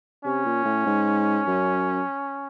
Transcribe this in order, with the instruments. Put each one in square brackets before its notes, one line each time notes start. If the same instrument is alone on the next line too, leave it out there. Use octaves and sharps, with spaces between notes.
[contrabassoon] C3 [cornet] C#4
[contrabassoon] A#2
A2
G#2
F#2